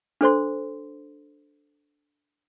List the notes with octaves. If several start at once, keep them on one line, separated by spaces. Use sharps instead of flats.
D4 A4 C5 C6